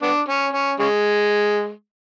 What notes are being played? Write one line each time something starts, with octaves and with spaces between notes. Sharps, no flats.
B3 D4
C#4
C#4
C#3 G#3